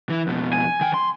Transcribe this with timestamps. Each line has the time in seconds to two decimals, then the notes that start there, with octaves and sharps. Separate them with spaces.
0.09 E3 E4
0.27 F2 B2
0.53 G#5
0.81 D#3 G5
0.94 C6